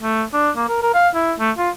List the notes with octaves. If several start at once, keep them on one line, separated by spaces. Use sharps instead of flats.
A3
D4
A#3
A#4
A#4
F5
E4
A3
F4